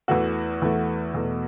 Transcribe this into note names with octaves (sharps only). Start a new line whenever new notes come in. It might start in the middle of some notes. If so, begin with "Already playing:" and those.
E2 E3 A3 F#4
E2 E3 A3
E2 B2 A3